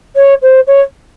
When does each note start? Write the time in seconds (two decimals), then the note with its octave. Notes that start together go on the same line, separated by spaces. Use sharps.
0.16 C#5
0.42 C5
0.67 C#5